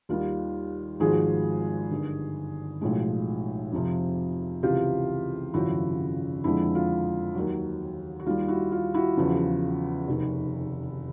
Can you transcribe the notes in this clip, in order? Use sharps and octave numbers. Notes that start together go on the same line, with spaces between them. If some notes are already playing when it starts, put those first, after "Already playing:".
D#2 D#3 G3 F4
G#1 G#2 F3 G#3 F#4 G#4
G1 G2 D#3
B1 A2 F3 G#3
F2 C3 F3
C#2 C3 E3 F4 G4
G#1 F#2 C#3 F3 E4 F#4
F2 D3 F3 G#3 E4
F4
D#2 D#3 F#3
F#4
D#2 D#3 G3 F4
E4 F#4
F4
E4 F#4
E2 C#3 F3
F1 D#2 D#3